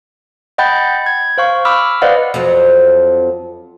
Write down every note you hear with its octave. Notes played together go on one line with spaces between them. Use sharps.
D#5 F#5 G5 B5 G6 A6
G#6
C5 F5 C#6
B5 D6 E6 F6
B4 C5 D5 D#5 F5 F#5
F2 F3 F#3